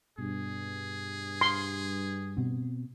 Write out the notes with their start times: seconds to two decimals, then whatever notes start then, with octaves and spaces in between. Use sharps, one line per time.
0.18 G2 B2 G#4
1.41 C6
2.37 B2 B3 C4